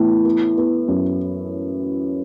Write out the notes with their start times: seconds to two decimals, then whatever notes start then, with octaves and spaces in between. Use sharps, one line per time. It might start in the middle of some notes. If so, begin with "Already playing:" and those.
Already playing: A2 E3 B3
0.25 B3
0.57 B3
0.88 F#2